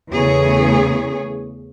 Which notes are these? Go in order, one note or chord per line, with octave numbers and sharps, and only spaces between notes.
E2 C#3 A3 G#4 C#5